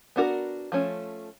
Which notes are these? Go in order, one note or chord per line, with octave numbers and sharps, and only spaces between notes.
B3 D4 F#4 A#4
F3 A3 C#4